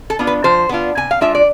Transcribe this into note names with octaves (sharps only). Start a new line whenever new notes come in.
A4
B3 D4 F4
B4
F3 C5
B3 D4 F4
C3 G#5
F5
G#3 D4 F4 E5
D5